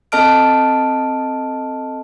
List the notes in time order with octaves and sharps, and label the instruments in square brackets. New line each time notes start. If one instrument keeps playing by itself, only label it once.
[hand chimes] C4 A4 D#5 A5 F6 D7